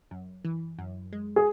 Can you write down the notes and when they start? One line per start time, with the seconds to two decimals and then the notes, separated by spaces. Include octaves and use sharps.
0.11 F#2
0.45 E3
0.79 F#2
1.12 G#3
1.36 G#4